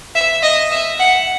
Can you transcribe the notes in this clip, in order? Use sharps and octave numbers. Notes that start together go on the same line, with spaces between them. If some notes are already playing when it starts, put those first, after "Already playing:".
E5
D#5
E5
F#5